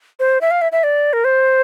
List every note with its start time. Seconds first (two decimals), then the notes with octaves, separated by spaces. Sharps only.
0.20 C5
0.41 E5
0.51 F5
0.62 E5
0.72 E5
0.84 D5
1.13 A#4
1.24 C5